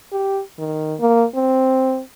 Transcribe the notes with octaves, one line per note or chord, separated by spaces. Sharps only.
G4
D#3
A#3
C4